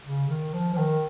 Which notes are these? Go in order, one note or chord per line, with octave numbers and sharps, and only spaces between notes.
C#3
D#3
F3
F3
D#3